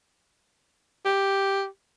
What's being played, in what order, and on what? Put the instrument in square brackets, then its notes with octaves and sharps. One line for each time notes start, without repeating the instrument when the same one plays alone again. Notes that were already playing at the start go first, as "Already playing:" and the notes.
[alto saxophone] G4